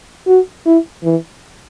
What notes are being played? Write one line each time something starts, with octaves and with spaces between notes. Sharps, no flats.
F#4
E4
E3